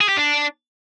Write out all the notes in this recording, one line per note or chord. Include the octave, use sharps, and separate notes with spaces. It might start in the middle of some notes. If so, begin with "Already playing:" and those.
G#4
G4
D4